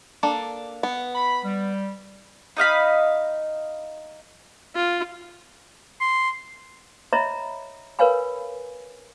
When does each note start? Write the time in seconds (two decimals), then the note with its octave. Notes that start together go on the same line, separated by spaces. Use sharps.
0.23 A#3 D4 A4
0.83 B3
1.15 B5
1.44 G3
2.57 D#4 D#5 F5 B5
4.75 F4
6.01 C6
7.13 C#5 D#5 E5 A#5 B5
7.99 A#4 B4 C#5 F5 G#5 B5